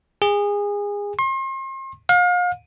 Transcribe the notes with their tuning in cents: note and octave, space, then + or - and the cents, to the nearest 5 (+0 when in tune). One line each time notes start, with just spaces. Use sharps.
G#4 -25
C6 +40
F5 +35